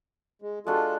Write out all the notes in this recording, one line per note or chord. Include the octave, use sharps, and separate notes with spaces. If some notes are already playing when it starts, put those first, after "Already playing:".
G#3
G#3 D4 F4 F#4 A4